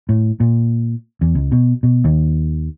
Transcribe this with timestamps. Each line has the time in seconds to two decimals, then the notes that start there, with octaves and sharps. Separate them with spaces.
0.09 A2
0.40 A#2
1.21 E2
1.35 C#2
1.52 B2
1.83 B2
2.05 D#2